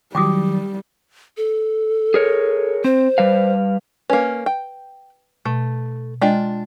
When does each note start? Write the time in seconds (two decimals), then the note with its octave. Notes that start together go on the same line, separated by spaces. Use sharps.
0.15 D#3 F#3 G3 G5 D6 D#6
1.37 A4
2.14 G#4 A#4 C#5
2.84 C4 C5
3.18 G3 B4 F5
4.10 A#3 C#4 B4
4.46 G5
5.45 B2 A3
6.22 G#3 D4 F4 D#5 G5